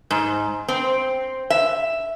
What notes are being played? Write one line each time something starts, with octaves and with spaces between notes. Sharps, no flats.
G#2
C4
E5